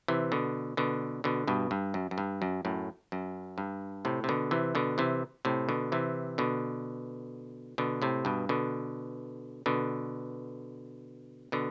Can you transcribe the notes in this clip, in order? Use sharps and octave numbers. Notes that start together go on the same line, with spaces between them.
C3 E3
B2 D3
B2 D3
B2 D3
G2 B2
G2
F#2
F#2
G2
F#2
F#2 A2
F#2
G2
A2 C3
C3
B2 D3
C3 E3
B2 D3
C3 E3
A2 C3
B2 D3
C3 E3
B2 D3
B2 D3
A2 C3
G2 B2
B2 D3
B2 D3
B2 D3